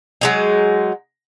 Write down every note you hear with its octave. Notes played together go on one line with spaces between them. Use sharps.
F#3 G#3 D#4